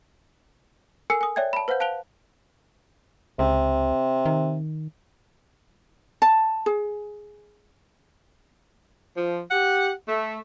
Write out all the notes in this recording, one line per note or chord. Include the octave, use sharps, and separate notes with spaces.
A4 A#4 G#5 E6 C7 C#7
G#5 D#6
C#5 D5 E5 G5 G#6
A5 B5
B4 C5 F5 F#5 G6
F5 A5 F#6 D7 F7 G7
C#2 C3
D#3
A5
G#4
F3
G4 F#5
A3